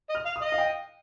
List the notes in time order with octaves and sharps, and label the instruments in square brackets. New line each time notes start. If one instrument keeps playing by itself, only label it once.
[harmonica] D#5
[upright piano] F6
[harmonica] F5
[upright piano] D#6
[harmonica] D#5
[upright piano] F5
G5